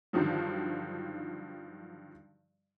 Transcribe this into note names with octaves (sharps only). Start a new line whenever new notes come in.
G2 D3 D#3 F3 F#3